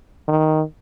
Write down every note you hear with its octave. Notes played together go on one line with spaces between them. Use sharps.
D#3